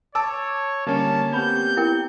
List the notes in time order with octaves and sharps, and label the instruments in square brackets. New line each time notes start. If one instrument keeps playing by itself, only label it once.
[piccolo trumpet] C#5 [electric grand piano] A5 D6 E6
[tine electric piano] D3 G3 [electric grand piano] A#3 C#4 C#5 [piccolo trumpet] A5
[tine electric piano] B3 C4 G4 [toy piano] B5 [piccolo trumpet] G6
[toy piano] E4 A#4 G5